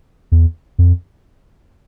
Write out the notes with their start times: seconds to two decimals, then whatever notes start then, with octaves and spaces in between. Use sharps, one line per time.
0.32 E2
0.78 F2